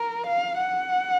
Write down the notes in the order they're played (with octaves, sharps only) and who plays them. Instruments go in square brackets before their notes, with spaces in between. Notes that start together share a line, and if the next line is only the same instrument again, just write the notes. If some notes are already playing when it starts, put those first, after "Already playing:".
Already playing: [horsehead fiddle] A#4
F5
F#5